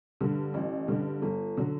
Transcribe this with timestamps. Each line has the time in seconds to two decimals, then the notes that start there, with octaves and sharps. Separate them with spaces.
0.21 G2 D3
0.54 A1
0.88 G2 D3
1.22 G1
1.57 D3 F#3